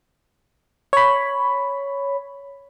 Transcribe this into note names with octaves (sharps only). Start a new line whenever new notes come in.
C#5 B5